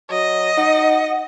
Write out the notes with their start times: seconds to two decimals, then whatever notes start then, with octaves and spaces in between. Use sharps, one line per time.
0.11 F#3 D#5
0.57 D#4 F#5